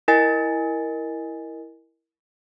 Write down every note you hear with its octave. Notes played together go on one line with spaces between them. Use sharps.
E4 A#4 D#5 G#5 A6